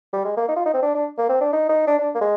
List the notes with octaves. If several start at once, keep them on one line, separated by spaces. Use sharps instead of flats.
G3
G#3
A#3
D#4
F4
D#4
C4
D4
D4
A#3
C4
D4
D#4
D#4
D4
D4
A#3
G#3